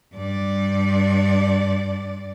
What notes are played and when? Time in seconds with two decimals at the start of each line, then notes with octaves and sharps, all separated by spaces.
0.14 G2 D5